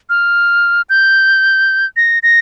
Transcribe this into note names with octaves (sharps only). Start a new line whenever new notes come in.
F6
G6
A#6
A#6